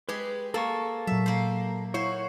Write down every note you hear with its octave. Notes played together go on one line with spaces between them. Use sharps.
G#3 G4 G#4 B4
A#3 A4 A5 C#6
A#2 F#3 E5
A#3 C5
E4 F#4 C5 C#5